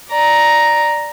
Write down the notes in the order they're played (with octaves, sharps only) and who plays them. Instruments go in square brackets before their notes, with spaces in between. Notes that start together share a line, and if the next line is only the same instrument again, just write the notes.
[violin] D5 A#5